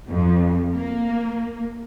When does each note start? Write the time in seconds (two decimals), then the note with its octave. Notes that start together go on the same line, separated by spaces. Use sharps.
0.10 F2
0.74 A#3